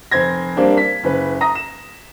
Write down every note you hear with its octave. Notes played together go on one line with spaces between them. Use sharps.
F1 C5 G#6 A#6
G3 A#3 C4 D4
B6
F#1 B4
A#5 D#6 A#6
E7